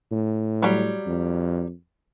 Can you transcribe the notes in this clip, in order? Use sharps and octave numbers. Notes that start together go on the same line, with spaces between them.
A2
F#3 G3
F2